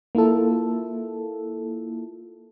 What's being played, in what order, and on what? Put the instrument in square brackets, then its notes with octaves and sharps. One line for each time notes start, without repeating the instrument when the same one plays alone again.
[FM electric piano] A#3 E4 F4 A4